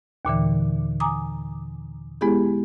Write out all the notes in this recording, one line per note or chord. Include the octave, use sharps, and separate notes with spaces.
D#2 A#2 D3 E3
G#5 A#5 D6 D#6
G#3 B3 E4 G4 G#4